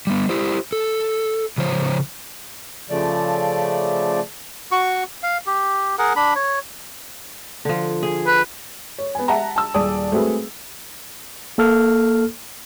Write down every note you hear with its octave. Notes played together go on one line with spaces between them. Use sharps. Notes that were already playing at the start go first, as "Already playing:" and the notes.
G3 B3
E4 G4 C5
A4
C#3 F3 C5 C#5
C#3 F3 A3 D5
F#4 C#6
F5
G4
G#4 A#4 F#5
D4 B5
C#5
D3 F3
G#4
B4
C#5
B3 G#5
E5 F#5 A5 A#5
A5 E6
D#1 G#4 D5 A5 D#6
A3 C4 F#4 G#4 B4
A#3 A4 F6